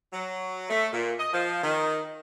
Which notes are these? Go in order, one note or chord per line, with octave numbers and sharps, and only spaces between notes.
F#3
A3
A#2
D#5
F3
D#3